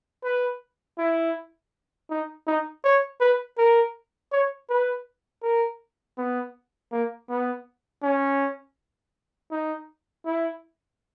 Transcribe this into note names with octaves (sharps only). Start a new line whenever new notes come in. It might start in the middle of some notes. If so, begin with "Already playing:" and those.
B4
E4
D#4
D#4
C#5
B4
A#4
C#5
B4
A#4
B3
A#3
B3
C#4
D#4
E4